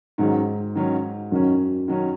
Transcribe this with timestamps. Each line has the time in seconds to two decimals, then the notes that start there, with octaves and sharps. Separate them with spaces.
0.18 G#2 D#3 F#3 C#4
0.75 D#3 F#3 C#4
1.32 F#2 D#3 F#3 C#4
1.88 D#3 F#3 C#4